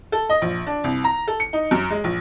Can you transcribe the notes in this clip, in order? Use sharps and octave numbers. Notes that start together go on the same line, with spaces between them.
A4
D#5
A#1
D4
C2
A#5
A4
C#7
D#4
F#2
G#3
A#1